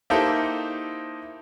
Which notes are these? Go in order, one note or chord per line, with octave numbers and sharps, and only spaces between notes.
A#3 D#4 E4 G4 A4 C5